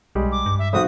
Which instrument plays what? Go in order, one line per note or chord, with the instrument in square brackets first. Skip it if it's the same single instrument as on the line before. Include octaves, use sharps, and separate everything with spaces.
[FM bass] B1 [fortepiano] G3 G#3
[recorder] D6
[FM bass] G2
[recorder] E5
[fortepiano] B1 C4 F#4 [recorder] D#6